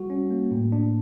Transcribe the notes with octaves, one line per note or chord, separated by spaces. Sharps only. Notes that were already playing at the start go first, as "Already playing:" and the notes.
Already playing: G3 F#4
C#4
A#3
A2
D4